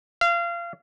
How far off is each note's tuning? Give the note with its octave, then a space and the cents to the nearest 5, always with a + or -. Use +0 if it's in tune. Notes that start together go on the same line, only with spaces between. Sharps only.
F5 -25